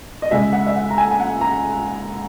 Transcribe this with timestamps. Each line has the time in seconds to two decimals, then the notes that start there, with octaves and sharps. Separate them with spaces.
0.22 D#5
0.31 C#3 G#3 E5
0.53 F#5
0.67 E5
0.76 F#5
0.90 A#5
0.98 G#5
1.11 G#5
1.20 F#5
1.41 A#5